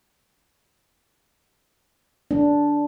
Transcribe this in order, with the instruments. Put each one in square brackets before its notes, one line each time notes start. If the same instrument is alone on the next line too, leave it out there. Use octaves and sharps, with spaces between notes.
[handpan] D4